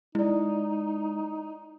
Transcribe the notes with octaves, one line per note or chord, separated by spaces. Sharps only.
G#3 D#4 E4 D5